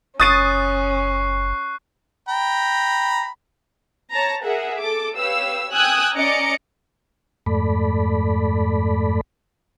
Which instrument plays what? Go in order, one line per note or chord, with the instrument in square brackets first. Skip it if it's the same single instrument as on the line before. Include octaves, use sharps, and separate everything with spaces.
[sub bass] F#1 [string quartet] C#4 [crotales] C#6 F#6 C7 [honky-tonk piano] D#6 A6 D#7
[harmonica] G5 A#5 B5
[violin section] C#5 A5 A#5
G#4 A#4 E5 F#5
A4 D6
G4 B4 C#5 F5 E6
G5 G#5 D#6 E6 F#6 G#6
C#4 D5 D#5 A#5 D6 C#7
[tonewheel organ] F2 G#2 A3 A4 D5 B5